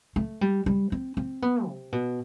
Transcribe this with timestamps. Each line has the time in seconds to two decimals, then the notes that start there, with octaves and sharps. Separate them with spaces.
0.16 A3
0.41 G3
0.66 G3
0.92 C4
1.17 C4
1.42 B3
1.67 C3
1.92 B2